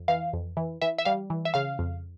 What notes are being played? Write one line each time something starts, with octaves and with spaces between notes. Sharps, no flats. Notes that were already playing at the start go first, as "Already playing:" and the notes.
Already playing: F2
E3 F5
F2
E3
E3 E5
E5
G3 F5
E3
E5
C#3 F5
F2